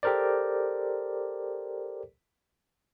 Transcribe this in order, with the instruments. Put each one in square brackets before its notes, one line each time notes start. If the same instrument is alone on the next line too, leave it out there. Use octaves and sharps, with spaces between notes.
[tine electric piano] G4 A4 A#4 C5 D5